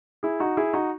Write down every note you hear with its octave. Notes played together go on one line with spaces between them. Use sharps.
E4 G#4
D#4 F#4
E4 G#4
D#4 F#4